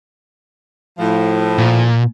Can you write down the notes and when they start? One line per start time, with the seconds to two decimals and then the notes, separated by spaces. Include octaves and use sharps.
0.99 A2 F3
1.58 A#2